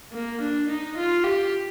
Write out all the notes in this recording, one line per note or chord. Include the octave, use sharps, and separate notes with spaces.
A#3
D4
D#4
F4
G4